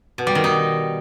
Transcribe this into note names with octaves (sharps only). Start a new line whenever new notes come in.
B2
G3
D#3
D#4